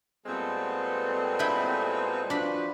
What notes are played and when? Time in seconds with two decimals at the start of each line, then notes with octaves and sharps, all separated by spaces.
0.26 A#2 G3 G#3 B3 C4 A4
1.39 E4 B4 G5
2.30 F3 D4 F#4 B4 B5